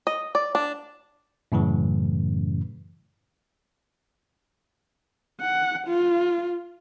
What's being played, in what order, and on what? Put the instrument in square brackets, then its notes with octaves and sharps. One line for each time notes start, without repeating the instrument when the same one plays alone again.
[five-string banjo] D#5
D5
D4
[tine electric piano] F#2 A2 C#3 E3
[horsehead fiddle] F#5
F4